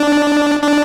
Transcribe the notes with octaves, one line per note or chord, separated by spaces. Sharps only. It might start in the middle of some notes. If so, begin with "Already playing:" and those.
Already playing: D4
D4